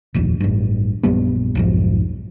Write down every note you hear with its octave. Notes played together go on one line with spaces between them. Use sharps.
F1 A#1 D#2
A1 G2
A#1 F#2 G3 B3
B1 F2 G#2